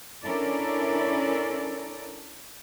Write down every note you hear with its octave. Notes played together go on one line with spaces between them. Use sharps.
C#4 D4 E4 A4 A#4 D5